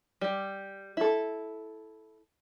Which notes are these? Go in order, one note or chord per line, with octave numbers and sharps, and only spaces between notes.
G3
E4 A4